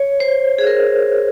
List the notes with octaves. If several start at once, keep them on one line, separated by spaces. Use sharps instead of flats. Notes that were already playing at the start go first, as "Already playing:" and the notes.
Already playing: C#5
C5
G#4
A#4